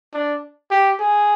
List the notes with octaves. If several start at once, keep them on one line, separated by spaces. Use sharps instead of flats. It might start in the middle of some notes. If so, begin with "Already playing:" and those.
D4
G4
G#4